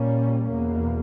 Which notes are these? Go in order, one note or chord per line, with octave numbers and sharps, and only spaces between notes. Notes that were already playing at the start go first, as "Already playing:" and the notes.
Already playing: A#2 G3 A#3 C#4
E2 B2 A#3